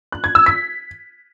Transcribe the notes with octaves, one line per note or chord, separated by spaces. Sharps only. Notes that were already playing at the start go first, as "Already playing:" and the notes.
F#6
G#6
E6
B6